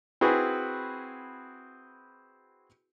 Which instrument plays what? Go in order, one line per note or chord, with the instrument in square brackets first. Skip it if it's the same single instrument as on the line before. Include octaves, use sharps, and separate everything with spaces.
[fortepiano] C4 E4 F#4 G#4 B4